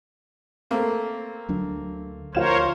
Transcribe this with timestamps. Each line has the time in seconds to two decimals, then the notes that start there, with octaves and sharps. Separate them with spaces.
0.71 A3 A#3 C4
1.49 D2 F#3 D4
2.35 D2 F3 F4 A#4 C5 C#5 E7